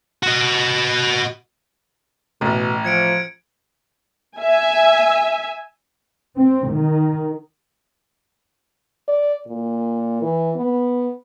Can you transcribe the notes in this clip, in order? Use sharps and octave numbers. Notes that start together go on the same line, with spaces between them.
F#4 D#5
A1 B2 A3
F3 G#6 C#7 D7
E5 G#5
C4
D#3
D5
A#2
E3
B3